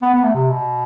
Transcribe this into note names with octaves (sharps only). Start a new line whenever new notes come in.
B3
B3
A3
C3
B2